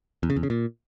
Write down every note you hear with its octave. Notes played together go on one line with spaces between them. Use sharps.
E2
C#3
E2
C#3
A#2